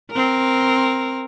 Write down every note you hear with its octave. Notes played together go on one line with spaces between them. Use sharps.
C4 A#4